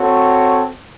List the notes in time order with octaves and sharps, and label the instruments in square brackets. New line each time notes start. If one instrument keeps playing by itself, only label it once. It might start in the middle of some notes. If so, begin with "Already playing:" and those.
Already playing: [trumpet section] C4 F#4 A4 C#5